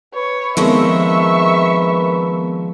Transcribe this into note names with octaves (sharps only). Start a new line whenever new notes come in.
B4 C#5
D#3 F3 G#3 B3 C4 A#4 E5 C#6